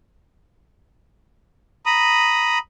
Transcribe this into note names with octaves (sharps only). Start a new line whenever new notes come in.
A#5 B5 D#6